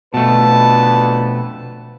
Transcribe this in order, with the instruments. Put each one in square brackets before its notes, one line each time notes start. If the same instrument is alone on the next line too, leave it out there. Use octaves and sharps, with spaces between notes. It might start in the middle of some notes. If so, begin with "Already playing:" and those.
[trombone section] F2 D3 B4 [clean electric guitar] B2 A3 [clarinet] A5